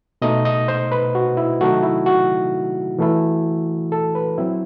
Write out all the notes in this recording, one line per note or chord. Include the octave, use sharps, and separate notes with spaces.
B2 A3 D#4 D#5
D#5
C5
B4
F#4
E4
C3 D#3 F#3 A3 D#4 F#4
E4
F#4
E3 A3 E4
A4
B4
F#3 C4 E4